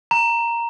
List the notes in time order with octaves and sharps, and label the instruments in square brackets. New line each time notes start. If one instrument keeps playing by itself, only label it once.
[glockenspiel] A#5